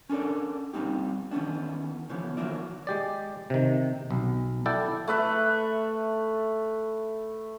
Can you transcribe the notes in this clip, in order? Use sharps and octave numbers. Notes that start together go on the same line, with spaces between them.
C#4 D4 A4 A#4 D5
A#2 G3 A#3 C4 D#4 G4
D#3 E3 F#3 B3 C#4 D4
C#3 E3 F3 B3
D#3 F#3 A#3 E4 D5
G#3 G4 D5
C3 D#3
B1
E4 A4 D5 F#5 G5
A3 B4 E5